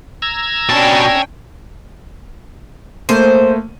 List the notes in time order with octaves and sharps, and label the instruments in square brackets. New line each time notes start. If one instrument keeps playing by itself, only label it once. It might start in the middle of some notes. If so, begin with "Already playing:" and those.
[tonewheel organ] A#5 E6 G#6
[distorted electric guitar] B2 A5 [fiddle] C#4 D4 [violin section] G5
[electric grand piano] A3 A#3 D#7 [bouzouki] C5